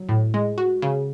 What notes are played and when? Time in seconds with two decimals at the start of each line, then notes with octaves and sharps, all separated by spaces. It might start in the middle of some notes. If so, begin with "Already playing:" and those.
Already playing: F#3
0.09 A2
0.34 G#3
0.58 F#4
0.82 C#3